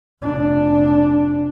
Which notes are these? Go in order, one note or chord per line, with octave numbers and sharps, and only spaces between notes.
F1 D4